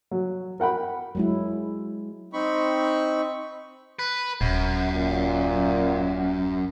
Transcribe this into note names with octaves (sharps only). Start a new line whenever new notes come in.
F#3
A#4 F#5 G5 B5
F#3 G#3 E4
C4 D#4 B5 C#6
B4
D#1 F#2
A#2